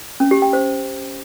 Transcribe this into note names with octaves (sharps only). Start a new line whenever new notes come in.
C#4
G4
G5
C5